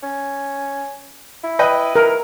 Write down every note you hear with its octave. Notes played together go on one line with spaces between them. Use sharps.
C#4
E4
B4 D#5 G5
E3 A#4